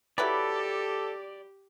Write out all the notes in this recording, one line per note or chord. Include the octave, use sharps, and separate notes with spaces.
F#3 E4 G4 A4 B4 D5